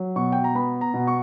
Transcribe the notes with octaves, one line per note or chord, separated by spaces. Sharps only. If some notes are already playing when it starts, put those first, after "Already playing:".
Already playing: F#3
B2 C#6
G5
A#5
B3 B5
A#5
B2
C#6